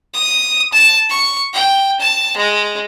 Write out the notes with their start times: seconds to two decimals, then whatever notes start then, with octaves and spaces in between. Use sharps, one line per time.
0.14 D#6
0.73 A5
1.10 C#6
1.53 G5
2.00 A5
2.37 G#3